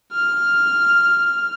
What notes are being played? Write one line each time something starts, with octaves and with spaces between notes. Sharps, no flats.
F6